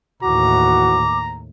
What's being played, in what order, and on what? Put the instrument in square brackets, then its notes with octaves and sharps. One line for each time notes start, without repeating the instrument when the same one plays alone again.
[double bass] D#2 A2 [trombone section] E3 F#4 [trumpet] A#5 [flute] D6